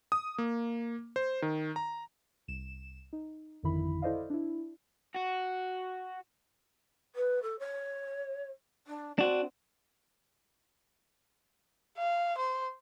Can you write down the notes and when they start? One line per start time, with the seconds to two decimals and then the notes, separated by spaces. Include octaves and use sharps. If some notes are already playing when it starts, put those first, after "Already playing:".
0.12 D#6
0.38 A#3
1.16 C5
1.42 D#3
1.76 A#5
2.48 C2 E7
3.13 D#4
3.63 G#1 F2 D3 D#3 E4 B5
4.02 E4 A4 C5 D5 D#5 F5
4.30 D4 E4
5.16 F#4
7.15 B4
7.42 A4
7.59 C#5
8.87 D4
9.19 C4 D4 F#4
11.98 F5
12.37 C5